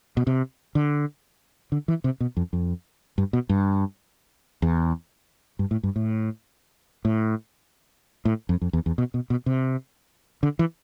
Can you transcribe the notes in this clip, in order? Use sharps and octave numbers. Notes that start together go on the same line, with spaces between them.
B2
C3
D3
D3
E3
C3
B2
F2
F2
G2
B2
G2
E2
G2
A2
G2
A2
A2
A2
F2
F2
E2
E2
B2
B2
B2
C3
D3
E3